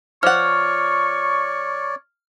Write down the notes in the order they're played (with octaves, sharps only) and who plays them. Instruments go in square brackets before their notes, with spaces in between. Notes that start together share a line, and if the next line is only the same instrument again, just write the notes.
[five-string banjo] F3 F#5 [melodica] C#5 D5 [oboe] C#6 [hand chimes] F6